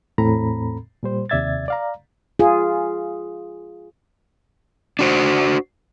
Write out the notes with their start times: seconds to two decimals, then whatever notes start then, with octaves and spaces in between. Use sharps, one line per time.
0.18 E2 A2 C4 A4 A#5 B5
1.03 A#2 G3 C5
1.29 D#2 C3 D5 E5 G#6 A6
1.68 D5 F5 A#5
2.39 F4 G#4
4.99 D4 F#4 C5